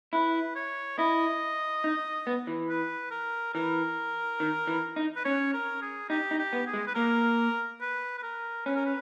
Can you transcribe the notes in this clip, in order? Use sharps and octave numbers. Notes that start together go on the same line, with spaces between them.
E4 B4
C#5
E4 D#5
D#4
B3
E3
B4
A#4
E3 A#4
D#3
E3
D#4
B4
C#4 C#5
A#4
G#4
D#4 G4
D#4
G4
B3
G#4
G#3
B4
A#3 A#4
B4
B4
A#4
C#4 B4
A#4
B4